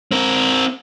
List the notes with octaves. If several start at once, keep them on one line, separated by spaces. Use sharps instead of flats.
C4 A#4